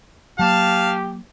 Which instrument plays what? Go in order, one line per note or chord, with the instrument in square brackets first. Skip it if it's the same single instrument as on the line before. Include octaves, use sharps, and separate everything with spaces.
[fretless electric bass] F#3 A#3 [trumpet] G4 [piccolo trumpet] F5 [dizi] A5